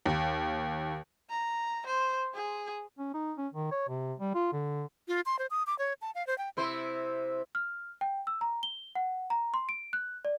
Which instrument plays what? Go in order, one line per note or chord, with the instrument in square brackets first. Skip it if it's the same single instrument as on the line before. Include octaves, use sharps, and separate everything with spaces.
[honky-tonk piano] D#2
[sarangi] A#5
C5
G#4
[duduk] C#4
D#4
C#4
D#3
C#5
C3
G3
F4
D3
[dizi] F4
C6
C5
D#6
D6
C#5
A5
F5
C5
G5
[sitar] C3 E4 C5
[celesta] F6
G5
E6
A#5
G7
F#5
A#5
C6
D7
F#6
D5